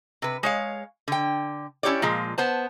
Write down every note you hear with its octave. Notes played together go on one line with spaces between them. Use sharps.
C3 B4
G#3 C#5 F5
D3 G5
C#4 E4 G4 C#5 D5
A#2 F3 G#3
B3 C5 A5